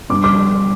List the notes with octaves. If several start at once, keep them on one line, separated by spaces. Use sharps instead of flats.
G2 D6
D6